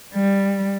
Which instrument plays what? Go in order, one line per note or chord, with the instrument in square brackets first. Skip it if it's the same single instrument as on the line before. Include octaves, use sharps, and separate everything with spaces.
[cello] G3